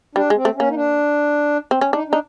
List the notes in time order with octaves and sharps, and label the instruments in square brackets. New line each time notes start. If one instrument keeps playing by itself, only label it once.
[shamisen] G3 [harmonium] D4
[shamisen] G#3
[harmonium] C4
[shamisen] A3
[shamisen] A#3 [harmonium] C#4
[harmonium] D#4
D4
[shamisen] C4
C#4
[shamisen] D4 [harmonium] D#4
[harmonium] D4 [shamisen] D#4